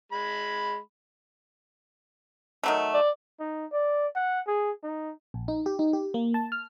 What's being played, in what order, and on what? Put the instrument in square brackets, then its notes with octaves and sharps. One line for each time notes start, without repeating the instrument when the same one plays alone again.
[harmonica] G#3 B5
[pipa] D#3 F#3 A3
[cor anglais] D5
[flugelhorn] D#4
D5
F#5
G#4
D#4
[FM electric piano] A#1
D#4
G4
D#4
G4
A#3
A5
F6